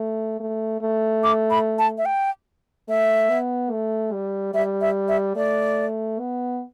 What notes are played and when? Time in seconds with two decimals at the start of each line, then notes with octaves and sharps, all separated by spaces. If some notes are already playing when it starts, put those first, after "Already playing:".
Already playing: A3
0.40 A3
0.81 A3
1.24 D6
1.50 B5
1.79 A5
1.98 E5
2.06 G5
2.88 A3 E5
3.29 B3
3.71 A3
4.12 G3
4.54 G3 E5
4.81 E5
5.08 E5
5.36 A3 D5
6.19 B3